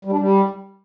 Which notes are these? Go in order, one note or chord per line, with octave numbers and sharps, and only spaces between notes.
G3
D4
G3